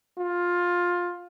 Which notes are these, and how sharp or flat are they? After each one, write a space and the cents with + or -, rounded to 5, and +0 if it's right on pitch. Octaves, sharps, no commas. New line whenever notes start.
F4 +15